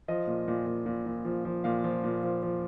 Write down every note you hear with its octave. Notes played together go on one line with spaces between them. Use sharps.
F3 D#5
A#2
A#2
A#2
A#2
A#2
F3
F3
A#2 F5
F3
A#2
F3
F3